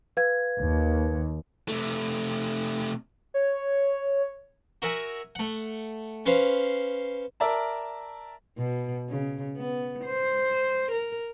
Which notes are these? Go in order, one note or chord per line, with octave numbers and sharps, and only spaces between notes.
B4 F5 G#6
D#2
C3 A3
C#5
F#4 A#4 E5 F#5 G#5
A3 F#5
C#4 B4 C5 F5
A#4 D5 E5 A5 A#5
B2
C#3
B3
C5
A#4